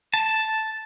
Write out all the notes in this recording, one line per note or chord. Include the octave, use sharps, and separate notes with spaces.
A5